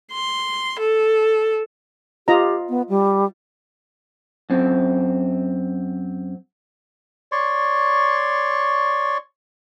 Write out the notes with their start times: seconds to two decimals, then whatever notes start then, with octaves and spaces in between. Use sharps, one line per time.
0.12 C6
0.79 A4
2.28 F4 G4 D#5 A#5
2.69 B3
2.89 G3
4.50 F#2 C4
7.32 C#5 D5 C6 C#6